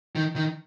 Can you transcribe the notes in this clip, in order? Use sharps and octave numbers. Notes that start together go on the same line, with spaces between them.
D#3
D#3